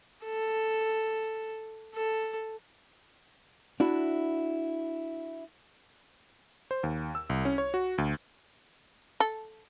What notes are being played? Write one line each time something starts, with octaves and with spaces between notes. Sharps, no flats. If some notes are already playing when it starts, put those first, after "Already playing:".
A4
A4
D4 E4 F#4
C5
D#2
E6
C2
C#4
C#5
F#4
D2
A4